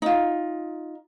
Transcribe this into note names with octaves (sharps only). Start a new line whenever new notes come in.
D#4 F4